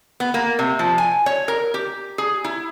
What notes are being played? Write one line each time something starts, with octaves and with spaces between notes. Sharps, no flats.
B3
A#3
C3
F3
G#5
C#5
A#4
G4
G#4
E4